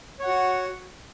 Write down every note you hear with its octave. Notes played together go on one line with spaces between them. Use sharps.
F#4 C#5 F#5